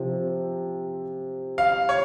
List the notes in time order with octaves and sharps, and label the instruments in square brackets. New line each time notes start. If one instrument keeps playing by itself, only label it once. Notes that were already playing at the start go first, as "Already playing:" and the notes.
Already playing: [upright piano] C3 F3 C4
[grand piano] F5
C#5